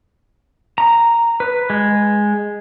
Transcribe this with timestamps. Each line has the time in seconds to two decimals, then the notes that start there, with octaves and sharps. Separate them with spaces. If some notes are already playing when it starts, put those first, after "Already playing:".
0.78 A#5
1.40 B4
1.70 G#3